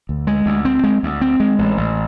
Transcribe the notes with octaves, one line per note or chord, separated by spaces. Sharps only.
D2
G#3
D2
C4
G#3
D2
C4
G#3
A1
A1